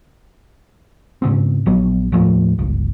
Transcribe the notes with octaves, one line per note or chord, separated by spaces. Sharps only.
G#2 C#3 B3 C4
A#1 F#3 B3
D#2 A2 F3 A3
G1 C#2